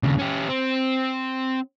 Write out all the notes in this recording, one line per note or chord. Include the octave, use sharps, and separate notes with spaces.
D#2 C#3
C#4 G4
C4